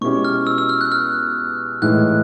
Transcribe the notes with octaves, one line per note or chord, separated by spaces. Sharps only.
B2 G#3 C#4 E4 G4 C#6
F6
E6
E6
F6
F#6
F6
A2 E3 G#3 F#6